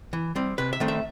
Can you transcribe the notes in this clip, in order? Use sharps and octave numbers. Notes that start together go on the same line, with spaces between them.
E3
G3 C4
C3 B4
E5
D#3 A3 C4
E5